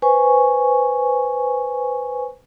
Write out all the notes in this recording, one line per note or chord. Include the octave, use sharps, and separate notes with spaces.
B4 C5 G#5 C#6